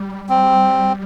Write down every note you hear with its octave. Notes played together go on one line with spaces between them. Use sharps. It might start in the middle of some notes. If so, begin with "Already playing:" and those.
Already playing: G3
C4